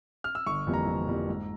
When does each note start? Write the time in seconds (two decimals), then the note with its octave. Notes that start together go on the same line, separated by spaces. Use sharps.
0.24 F6
0.35 E6
0.46 G1 C#6
0.67 F2 E3 G3 A#3
0.74 A#5
0.87 G1
1.07 F2 E3 G3 A#3
1.28 G#2